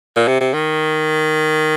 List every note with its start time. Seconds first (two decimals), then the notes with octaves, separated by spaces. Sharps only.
0.16 A#2
0.28 C3
0.40 C3
0.54 D#3